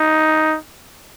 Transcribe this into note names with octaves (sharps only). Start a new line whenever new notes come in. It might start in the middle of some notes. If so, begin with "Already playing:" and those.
Already playing: D#4